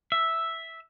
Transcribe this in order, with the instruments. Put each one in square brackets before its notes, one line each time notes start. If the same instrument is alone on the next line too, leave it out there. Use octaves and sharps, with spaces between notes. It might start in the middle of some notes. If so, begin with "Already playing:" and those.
[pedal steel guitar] E5